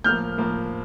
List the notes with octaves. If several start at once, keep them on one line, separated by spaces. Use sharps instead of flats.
A2 F3 A#3 F6 G6
A2 F3 A#3